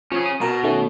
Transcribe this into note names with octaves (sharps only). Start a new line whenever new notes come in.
F3 C#4 G#4
D#6
B2 A#4 A#5
D#3 A3 C#4